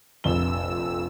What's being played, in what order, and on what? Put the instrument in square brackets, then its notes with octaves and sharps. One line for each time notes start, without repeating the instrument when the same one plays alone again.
[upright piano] F1 A#1 G7 [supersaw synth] F2 E6